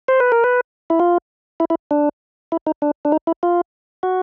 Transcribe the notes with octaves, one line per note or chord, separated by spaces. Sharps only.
C5
B4
A#4
B4
E4
F4
E4
E4
D4
E4
D#4
D4
D4
D#4
E4
F4
F#4